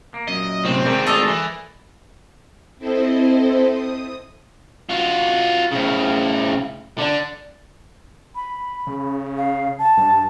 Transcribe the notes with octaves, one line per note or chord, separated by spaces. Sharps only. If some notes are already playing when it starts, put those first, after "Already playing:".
A#3
F#2 A#2 D#5
A2 C3 C4
G#3 G#4 A#4 D5 G5
D2 D4 F4 A4 D5 D#5
E3
C4 E4 A4 C5 D#5
D#6
F4 F#4
A2 C#3
D3 D4
B5
C#3
F5
A5
G2